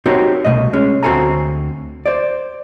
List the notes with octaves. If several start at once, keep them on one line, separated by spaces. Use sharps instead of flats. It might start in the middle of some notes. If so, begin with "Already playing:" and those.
C4 D#4 F#4 G4 A#4 C#5
C2 F2 B2 A3 D#5
G#3 C#4
D2 C4 F#4 A4 G#5 A#5
C5 D5